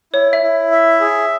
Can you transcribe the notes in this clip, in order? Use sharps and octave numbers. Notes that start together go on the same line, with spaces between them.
E4 C#5
E5
E4
E5
G#4